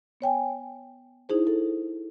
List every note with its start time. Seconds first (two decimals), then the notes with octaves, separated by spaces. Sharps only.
0.21 B3 C#5 G5 G#5
1.29 D#4 E4 G#4 C5
1.47 A4